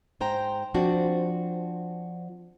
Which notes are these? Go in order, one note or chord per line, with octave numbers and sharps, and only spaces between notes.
G#2 C5 G5 A#5
F3 C4 D4 F#4